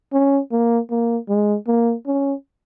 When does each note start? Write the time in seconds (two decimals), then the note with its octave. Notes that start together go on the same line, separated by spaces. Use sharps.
0.13 C#4
0.52 A#3
0.91 A#3
1.29 G#3
1.67 A#3
2.06 C#4